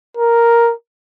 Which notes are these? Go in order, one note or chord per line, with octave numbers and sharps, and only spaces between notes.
A#4